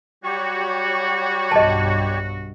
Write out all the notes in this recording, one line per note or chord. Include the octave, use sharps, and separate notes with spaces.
F#3 G3 F#4 G4 C#5 C#6
B1 G2 D#5 A5